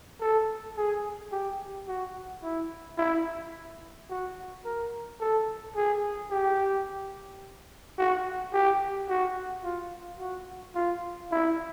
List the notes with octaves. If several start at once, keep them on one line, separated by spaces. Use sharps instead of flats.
A4
G#4
G4
F#4
E4
E4
F#4
A#4
A4
G#4
G4
F#4
G4
F#4
F4
F#4
F4
E4